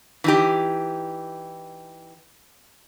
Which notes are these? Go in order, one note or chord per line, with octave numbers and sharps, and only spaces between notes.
E3 D#4 G4